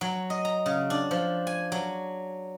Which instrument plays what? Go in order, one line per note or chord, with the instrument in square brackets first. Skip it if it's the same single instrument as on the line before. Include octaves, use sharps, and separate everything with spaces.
[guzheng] F#3
D#5
A#5
C#3
D4
F3
G#5
F#3